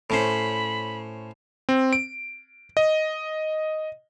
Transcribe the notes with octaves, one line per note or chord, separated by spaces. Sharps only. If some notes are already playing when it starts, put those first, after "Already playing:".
A2 C#4 C5 B5
C4
D7
D#5